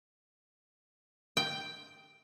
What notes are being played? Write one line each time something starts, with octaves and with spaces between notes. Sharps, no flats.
G5